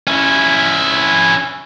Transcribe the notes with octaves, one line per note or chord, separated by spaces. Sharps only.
C#4 E4